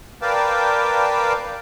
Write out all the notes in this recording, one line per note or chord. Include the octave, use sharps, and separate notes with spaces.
A#4 B4 D5 F5 G5 A5